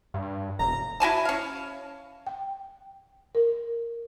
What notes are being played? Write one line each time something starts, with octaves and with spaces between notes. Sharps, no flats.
G2
E1 A#5
E4 F#4 G#5 A5
C#4 F5
G5
A#4